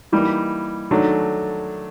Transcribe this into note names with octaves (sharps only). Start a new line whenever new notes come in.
E3 G3 A#3 D#4
D#3 F#3 A3 D4